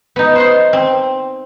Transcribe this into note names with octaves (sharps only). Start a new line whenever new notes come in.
B3 D#4
C5 F#5 C6
C4